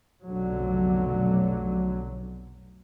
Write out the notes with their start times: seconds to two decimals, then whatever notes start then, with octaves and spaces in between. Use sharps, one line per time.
0.24 F1 B1 D3 F#3